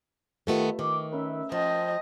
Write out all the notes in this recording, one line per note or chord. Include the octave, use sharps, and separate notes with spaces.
D#3 A3 B3 F4 G4
D#3 D6
C#4 A#4 B4 E5
F3 C5 D#5 G5 A5